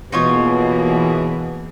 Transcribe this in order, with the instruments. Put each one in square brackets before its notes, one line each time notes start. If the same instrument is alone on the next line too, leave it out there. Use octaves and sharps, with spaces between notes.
[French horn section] B2 [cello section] E3 A#3 G#4 [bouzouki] D#4 F4 C#5